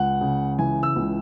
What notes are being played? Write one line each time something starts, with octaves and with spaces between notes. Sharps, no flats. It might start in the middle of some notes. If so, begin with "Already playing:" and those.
Already playing: C#2 F#5
C#3
E3 G#5
E6
C#2